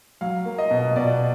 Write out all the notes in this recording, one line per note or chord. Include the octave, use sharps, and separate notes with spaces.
F#3 F5
A#3
D#5
B2
B2 D5